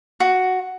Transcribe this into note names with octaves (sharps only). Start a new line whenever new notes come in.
F#4